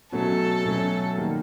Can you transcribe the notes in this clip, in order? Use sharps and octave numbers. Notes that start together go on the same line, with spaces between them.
B2 F#3 A3 C#4 A4
B2 F#3 A3 C#4
D#3 G3 A#3